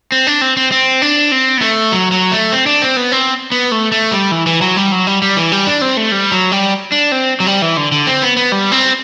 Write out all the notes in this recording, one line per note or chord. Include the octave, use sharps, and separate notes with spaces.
C4
D4
C4
C4
C4
D4
C4
B3
A3
F#3
F#3
A3
C4
D4
C4
B3
C4
B3
A3
A3
G3
E3
E3
F#3
G3
F#3
G3
G3
E3
G3
D4
C4
A3
G3
F#3
G3
D4
C4
F#3
G3
E3
D3
D3
C4
B3
B3
G3
C4